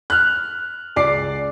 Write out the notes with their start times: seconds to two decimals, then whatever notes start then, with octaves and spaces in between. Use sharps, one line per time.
0.10 F6 F#6
0.96 C#2 D5 D6 C7